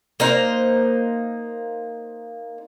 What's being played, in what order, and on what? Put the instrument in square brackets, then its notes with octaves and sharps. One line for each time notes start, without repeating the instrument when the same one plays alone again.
[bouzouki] A#3 D#4 C5